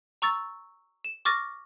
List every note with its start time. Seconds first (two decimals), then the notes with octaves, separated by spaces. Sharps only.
0.22 A#5 C#6 E6 A6
1.04 E7
1.25 C#6 D6 F6 A6 A#6